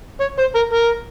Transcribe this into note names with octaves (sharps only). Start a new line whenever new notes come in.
C#5
C5
A#4
A#4